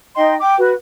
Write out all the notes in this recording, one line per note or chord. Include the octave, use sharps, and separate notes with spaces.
D#4 D#5 G5 C6
G5 D6
F#4 B4